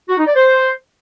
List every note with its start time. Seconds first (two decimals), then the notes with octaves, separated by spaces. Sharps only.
0.09 F#4
0.18 D#4
0.27 D5
0.36 C5